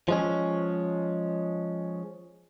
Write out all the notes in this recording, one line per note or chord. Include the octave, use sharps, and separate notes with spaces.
F3 G#3 C#4